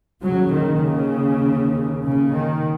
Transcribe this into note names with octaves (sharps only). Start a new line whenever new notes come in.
D#2 C#3 F#3
D#3
C#3
C#3
D#3